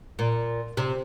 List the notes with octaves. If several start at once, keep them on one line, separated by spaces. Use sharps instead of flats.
A#2
C3